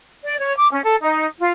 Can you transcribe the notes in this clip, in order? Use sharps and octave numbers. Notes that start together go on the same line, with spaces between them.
D5
C#5
D6
C#4
A4
D#4
F4